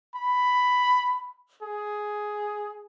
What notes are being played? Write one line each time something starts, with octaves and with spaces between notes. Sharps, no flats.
B5
G#4